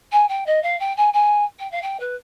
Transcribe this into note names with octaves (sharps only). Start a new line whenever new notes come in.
G#5
G5
D#5
F5
G5
G#5
G#5
G5
F5
G5
B4